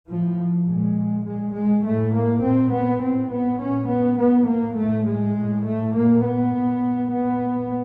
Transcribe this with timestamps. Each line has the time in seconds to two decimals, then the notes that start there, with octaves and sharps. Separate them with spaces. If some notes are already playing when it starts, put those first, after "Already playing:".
0.10 A2 F3
0.69 A#2 G#3
1.27 A#2 G#3
1.56 G#3
1.85 A2 A3
2.14 A#3
2.43 A#2 C4
2.73 B3
3.02 A2 C4
3.31 B3
3.61 A#2 C#4
3.89 B3
4.19 A2 B3
4.48 A#3
4.77 A2 A3
5.07 G#3
5.35 A2
5.64 A3
5.94 A#2 A#3
6.23 B3
6.52 A#2
7.11 A#2 B3